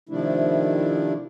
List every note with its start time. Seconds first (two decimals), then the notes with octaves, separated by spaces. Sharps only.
0.09 C3 D#3 F3 A3 D4 E4